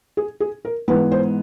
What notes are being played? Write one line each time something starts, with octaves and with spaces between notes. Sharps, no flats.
G#4
G#4
A#4
G#2 E3 G#3 B3 B4
C5